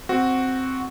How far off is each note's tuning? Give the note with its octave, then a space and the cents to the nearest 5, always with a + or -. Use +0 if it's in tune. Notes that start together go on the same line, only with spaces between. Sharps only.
C4 +0 F#4 +0